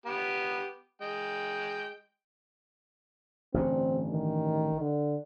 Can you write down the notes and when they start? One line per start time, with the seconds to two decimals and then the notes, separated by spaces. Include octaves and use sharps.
0.06 B3 G4
1.01 G#3 G5
3.54 A1 G2 D3 C4
4.11 D#3
4.80 D3